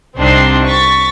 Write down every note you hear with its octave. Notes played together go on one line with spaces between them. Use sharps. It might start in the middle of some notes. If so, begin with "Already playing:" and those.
C2 C4 D4 D#4 C6
C#6 A6 B6